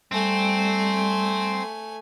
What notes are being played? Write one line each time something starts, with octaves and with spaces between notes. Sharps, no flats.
G3 A3 C4 G#5